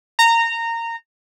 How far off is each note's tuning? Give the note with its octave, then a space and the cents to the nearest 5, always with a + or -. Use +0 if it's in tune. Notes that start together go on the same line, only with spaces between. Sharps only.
A#5 -15